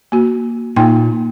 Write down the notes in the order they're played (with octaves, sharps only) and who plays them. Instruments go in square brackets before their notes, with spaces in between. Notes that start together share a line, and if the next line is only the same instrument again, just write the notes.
[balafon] A#3 F#4
[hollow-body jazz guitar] A#2 [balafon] A#3 D#4 G5